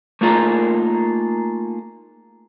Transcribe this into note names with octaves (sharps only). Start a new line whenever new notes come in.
A3 A#3 D#4 F4 G#4 A#4